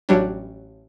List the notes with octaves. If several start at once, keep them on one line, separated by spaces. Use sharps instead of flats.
A1 F#3 G3 D4